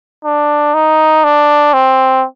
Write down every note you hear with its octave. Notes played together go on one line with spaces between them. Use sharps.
D4
D#4
D4
C4